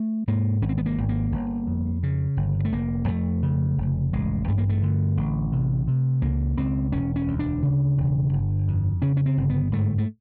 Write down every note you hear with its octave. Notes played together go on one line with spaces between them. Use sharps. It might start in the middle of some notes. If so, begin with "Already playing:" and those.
Already playing: A3
G#2 A#3
G#1 C#4
C4
B3
A#3
G#1
A#3
G1
F2
C#3
G1
A3
F1 A#3
F2 A3
C#3
F1
A1 G#3
G2 A3
A#3
A3
D3
A1
C3
C3
C#2 A#3
C#2 C4
E1 C#4
C#4
D2
D4
C#3
E1
G1
F2
C#3 C#4
C#4
C4
G1
B3
G#2 A3
A3